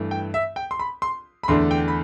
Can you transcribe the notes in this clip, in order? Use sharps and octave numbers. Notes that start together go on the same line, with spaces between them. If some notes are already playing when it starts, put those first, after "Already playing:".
Already playing: G2 E3 A3
G5
E5
G5
C6
B5
C6
B5
E2 D3 A3 D4 C6
G5
B5